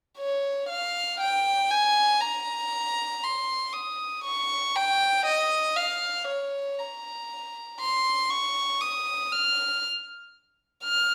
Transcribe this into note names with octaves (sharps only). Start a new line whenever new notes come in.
C#5
F5
G5
G#5
A#5
C6
D#6
C#6
G5
D#5
F5
C#5
A#5
C6
C#6
D#6
F6
F6